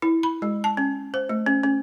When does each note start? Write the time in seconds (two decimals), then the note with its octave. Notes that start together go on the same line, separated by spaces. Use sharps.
0.02 E4
0.23 B5
0.42 G#3
0.64 A5
0.77 C#4
1.14 C5
1.29 A3
1.46 C#4
1.63 C#4